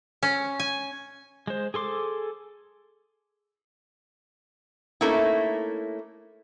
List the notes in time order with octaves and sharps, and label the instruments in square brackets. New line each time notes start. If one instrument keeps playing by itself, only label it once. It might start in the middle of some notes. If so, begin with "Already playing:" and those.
[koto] C#4
G#5
[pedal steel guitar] G#3 C5
G#4 A4 C6 D6
[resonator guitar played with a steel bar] A3 A#3 C#4 D#4 E4